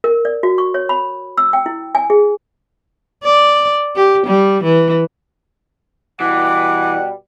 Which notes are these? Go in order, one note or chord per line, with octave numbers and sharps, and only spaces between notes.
A#4
D5
F#4
C#6
C#5
B5
E6
G5
E4
G#5
G#4
D5
G4
G3
E3
B2 E3 G3 F#5 D6